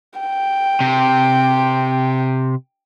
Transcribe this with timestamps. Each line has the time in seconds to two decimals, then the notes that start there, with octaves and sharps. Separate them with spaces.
0.20 G5
0.80 C3